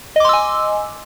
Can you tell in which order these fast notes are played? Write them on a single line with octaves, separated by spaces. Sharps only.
D#5 D6 C6 E6 G#5